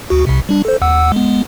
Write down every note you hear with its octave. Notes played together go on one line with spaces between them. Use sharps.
D2 F#4
C2 C3
G3 D4
A4 C5
D#2 F#5 E6
G#3 B3